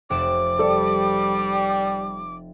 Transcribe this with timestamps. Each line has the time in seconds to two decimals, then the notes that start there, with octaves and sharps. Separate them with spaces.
0.10 F1 G4 D6 E7
0.59 G3 A4 D5